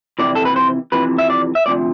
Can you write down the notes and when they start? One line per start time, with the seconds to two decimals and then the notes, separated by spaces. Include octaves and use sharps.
0.19 F2 C3 E3 D5
0.35 A4
0.45 B4
0.56 C5
0.92 F2 C3 E3 B4
1.18 E5
1.30 D5
1.55 E5
1.66 D2 C3 F3 D5